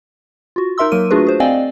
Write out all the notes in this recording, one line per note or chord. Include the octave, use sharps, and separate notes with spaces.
F4 F#4
D#4 A#4 E5 C6 E6
F#3 A#3 A#4 D#7
A3 D4 F4 F#4 G#4 B4
G#4 C5
C4 D5 D#5 F5 G5 G#5